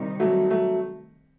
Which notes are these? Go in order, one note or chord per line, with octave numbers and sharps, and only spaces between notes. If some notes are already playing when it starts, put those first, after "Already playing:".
Already playing: C3 D#3 G3 D#4
F#3 A3
F#3 A3